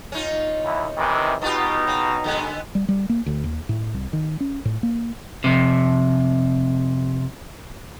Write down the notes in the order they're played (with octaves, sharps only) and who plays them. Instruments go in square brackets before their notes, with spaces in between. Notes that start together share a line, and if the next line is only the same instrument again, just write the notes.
[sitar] C#4 D#4 F4
[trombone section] D#2 E4
C3 D#3 E3
[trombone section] B2 D#4 [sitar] B3 F4 G4
[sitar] C#3
D3 G#3 B3
[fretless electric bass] G3
G3
A#3
D2
D#2
A2
C2
D#3
C#4
A2
A#3
[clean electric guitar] F2 C3